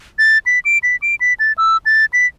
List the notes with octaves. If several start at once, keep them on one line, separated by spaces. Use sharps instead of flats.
A6
B6
D7
B6
D7
B6
A6
E6
A6
B6